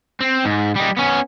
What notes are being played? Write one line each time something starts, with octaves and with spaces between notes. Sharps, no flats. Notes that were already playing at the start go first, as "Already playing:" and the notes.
C4
G#2
G3 D#4
B3 C#4